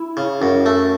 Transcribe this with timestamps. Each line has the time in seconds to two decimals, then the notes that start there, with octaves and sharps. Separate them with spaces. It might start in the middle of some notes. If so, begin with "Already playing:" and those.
Already playing: E4
0.17 C#3
0.41 F#2 C#4
0.66 A3